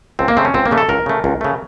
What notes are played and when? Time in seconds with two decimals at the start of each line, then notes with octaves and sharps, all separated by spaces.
0.19 C#2 C4
0.28 A#3
0.37 C#3 A3 C4
0.45 C#4
0.54 C#2 C4
0.66 A#3
0.71 C#3 A3
0.78 A4
0.89 C#2 A#4
1.06 C#3 A3
1.24 C#2
1.41 C#3 A3